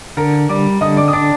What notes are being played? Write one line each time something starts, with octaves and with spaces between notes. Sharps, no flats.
D3 A#4 A#5
G3 D5 D6
D3 D#5 D#6
D5 D6
D#6
D4 D5 D6